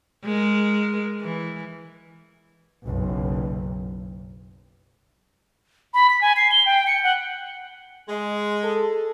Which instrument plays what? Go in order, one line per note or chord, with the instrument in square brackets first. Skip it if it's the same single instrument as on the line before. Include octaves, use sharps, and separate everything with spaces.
[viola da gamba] G#3 A#4
E3
[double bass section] F#1 B1
[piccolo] B5
B6
G#5
C7
G7
G5
C#7
F#5
[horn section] G#3
[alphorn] A4